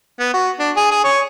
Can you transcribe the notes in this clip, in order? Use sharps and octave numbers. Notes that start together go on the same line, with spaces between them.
B3
F#4
D4
G#4
G#4
C#5